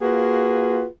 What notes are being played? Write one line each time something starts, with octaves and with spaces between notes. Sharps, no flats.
A#3 F4 F#4 G#4 B4